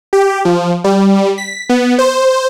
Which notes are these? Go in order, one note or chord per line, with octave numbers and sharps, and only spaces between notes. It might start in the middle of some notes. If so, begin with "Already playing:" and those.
G4
F3
G3
B6
B3
C5